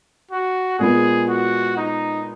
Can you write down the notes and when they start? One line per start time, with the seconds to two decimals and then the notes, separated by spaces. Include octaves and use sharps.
0.31 F#4
0.79 A#2 G#3 B3 G#4
1.28 F#4
1.77 D#4